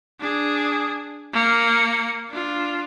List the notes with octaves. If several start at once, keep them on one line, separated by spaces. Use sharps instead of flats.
D4 G#4
A#3 C#7
D4 F4